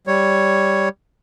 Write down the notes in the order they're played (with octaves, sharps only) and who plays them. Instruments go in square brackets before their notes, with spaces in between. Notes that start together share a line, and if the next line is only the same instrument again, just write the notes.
[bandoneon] G3 C#5